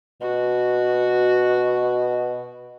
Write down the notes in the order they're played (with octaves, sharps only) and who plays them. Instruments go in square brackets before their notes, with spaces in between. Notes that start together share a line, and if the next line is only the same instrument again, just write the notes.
[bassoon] B2 [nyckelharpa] F#4